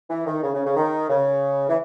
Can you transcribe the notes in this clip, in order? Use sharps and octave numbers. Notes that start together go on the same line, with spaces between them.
E3
D#3
C#3
C#3
C#3
D#3
C#3
E3